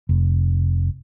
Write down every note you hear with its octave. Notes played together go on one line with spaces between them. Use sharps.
F1